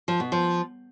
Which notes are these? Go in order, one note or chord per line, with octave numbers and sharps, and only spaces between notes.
F3
B2
F3